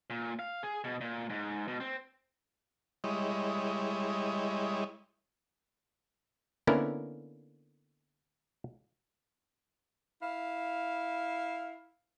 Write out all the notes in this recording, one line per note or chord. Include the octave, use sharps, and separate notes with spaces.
A#2
F5
G#4
B2
A#2
G#2
B2
C4
G3 G#3 E4 C#5 D#5
D3 A#3 B3 C#4 E4 A#4
E4 F5